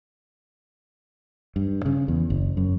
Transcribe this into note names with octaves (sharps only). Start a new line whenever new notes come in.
G2
C#3
E2
F#1
F#2